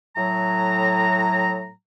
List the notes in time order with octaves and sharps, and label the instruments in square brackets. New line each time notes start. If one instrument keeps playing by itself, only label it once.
[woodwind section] A2 F#3 A#5